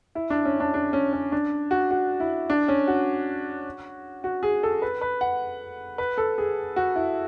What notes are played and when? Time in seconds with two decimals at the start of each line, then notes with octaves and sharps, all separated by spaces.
0.15 E4
0.30 D4
0.45 C#4
0.60 D4
0.74 D4
0.93 C#4
1.13 C#4
1.32 D4
1.71 F#4
1.91 F#4
2.20 E4
2.50 D4
2.68 C#4
2.88 F#4
4.24 F#4
4.43 G#4
4.63 A4
4.82 B4
5.01 B4
5.21 F#5
5.98 B4
6.18 A4
6.38 G#4
6.76 F#4
6.96 E4